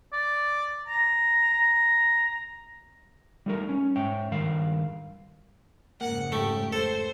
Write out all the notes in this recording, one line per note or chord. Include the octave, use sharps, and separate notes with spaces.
D5
A#5
A#5
G3 A3 D#4 A4 A#4
C#4
G#2 C#5 E5 G5
G2 D#3 A#4 F5
F2 G#2 C#3 A#3 F#5
A2 A3 G4
A4 C5